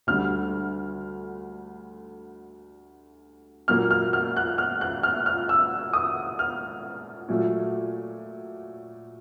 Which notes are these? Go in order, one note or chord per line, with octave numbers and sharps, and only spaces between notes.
D2 D3 G3 F6
A#2 F#3 A#3 F6
F6
F6
F#6
F6
F#6
F6
F6
E6
D#6
F6
A#2 F#3 A3